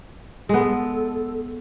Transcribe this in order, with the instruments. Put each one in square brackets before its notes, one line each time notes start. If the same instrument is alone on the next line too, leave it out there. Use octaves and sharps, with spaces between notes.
[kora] G#3 B3 [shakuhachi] A4